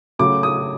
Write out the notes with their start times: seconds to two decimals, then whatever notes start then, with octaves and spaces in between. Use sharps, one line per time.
0.19 C#3 F#3 A3 D6
0.43 D#6